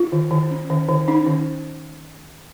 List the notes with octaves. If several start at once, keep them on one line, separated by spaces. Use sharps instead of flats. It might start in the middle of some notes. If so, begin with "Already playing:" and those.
Already playing: F4
D#3
D#3
C#4
D#3
D#3
C#4 D#4
D#3